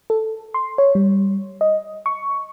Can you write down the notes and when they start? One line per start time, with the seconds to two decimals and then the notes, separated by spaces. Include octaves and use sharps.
0.10 A4
0.54 C6
0.78 C#5
0.95 G3
1.61 D#5
2.06 C#6